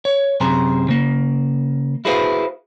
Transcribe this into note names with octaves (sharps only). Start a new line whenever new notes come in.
C#5
F#2 C3 G#4 C5 A#5
C#3 A#3
E4 F#4 G#4 B4 C5 F5